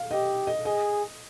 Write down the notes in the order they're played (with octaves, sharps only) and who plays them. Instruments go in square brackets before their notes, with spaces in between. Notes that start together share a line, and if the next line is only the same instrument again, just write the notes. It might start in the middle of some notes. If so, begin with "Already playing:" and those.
Already playing: [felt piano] F5
[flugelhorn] G4 [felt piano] D#5
[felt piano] D#5
[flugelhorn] G#4 [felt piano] D#5